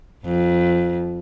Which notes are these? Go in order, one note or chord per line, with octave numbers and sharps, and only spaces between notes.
F2